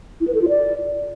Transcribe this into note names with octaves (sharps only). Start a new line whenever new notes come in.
E4
B4
A4
F4
D5